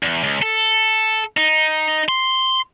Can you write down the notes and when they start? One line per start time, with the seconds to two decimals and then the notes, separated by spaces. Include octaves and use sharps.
0.03 E2
0.24 C#2
0.42 A4
1.37 D#4
2.09 C6